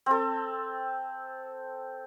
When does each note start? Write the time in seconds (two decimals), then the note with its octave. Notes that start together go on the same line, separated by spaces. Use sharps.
0.06 C4 A4